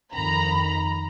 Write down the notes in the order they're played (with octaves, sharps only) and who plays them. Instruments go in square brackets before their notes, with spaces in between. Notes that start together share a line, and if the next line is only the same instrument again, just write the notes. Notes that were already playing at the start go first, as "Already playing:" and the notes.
[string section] F2 D#3 A#5 B5